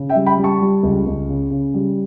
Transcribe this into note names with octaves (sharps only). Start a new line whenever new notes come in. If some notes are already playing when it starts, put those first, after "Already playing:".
Already playing: C#3
E5 G5
G3
G5 B5
G3
A5 C#6
G3
C#2
C#2
C#3
C#3
G3